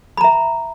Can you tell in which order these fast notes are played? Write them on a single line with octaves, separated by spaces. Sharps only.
B5 A#5 E5